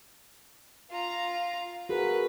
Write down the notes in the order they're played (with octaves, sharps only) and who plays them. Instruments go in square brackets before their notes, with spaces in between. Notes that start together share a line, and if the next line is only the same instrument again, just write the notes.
[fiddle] F4 A#5
[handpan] F#4 G#4 A#4 [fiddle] B4